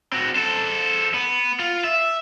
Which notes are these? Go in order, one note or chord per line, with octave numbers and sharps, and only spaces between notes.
C4 F#4
A4 C5
B3
F4
E5